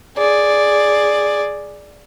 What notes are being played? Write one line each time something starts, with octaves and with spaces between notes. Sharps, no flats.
G#4 D5